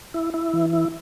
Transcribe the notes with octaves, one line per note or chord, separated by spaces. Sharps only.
E4
E4
E3
E4